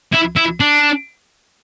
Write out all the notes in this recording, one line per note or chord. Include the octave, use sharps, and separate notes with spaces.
E4
E4
D4